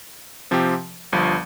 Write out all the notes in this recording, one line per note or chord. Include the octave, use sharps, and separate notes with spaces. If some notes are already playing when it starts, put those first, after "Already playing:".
C3 F3 C4 G4
G1 G2 F3